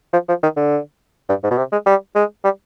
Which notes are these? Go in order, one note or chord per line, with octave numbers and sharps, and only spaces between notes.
F3
F3
D#3
D3
G2
G#2
B2
C3
G#3
G3
G#3
G3